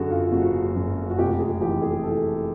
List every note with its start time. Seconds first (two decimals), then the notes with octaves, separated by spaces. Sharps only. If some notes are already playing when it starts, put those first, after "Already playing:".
Already playing: F#2 D3 F#4 G#4 A4
0.10 F4
0.32 F#1 F#4
0.76 F#2
1.10 F#4
1.19 F1 G4
1.39 G#4
1.61 E3 G4
1.82 G#4
2.04 E3 A4